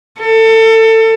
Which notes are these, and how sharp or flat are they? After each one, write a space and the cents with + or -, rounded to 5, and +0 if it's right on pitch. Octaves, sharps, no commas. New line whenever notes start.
A4 +25